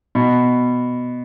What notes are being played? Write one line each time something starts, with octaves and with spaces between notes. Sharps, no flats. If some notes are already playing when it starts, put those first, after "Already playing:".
B2